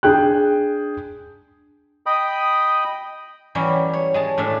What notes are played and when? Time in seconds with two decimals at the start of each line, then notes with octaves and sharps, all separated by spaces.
0.03 D4 G#4 G5 F#6
2.06 D#5 G5 B5 D#6
3.55 E3 F#3 G3 C#4
3.93 C#5
4.14 G#3 G#4 A5
4.38 A2 D4 E5